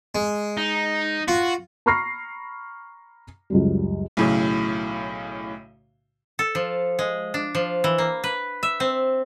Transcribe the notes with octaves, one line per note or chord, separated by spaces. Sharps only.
G#3
D#4
F4 F#4
A#5 B5 C#6 F6 A#6 C7
C#2 F#2 G3
B1 A2 C#3
A4
F3
G#3
D4
F3
E3
A#3
B4
E5
C4